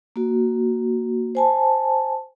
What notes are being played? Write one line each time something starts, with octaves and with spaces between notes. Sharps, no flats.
A#3 F#4
C5 G#5 A5